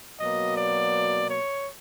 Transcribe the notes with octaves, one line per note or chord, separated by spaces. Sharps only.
B2 F#3 A#3 D#5
D5
C#5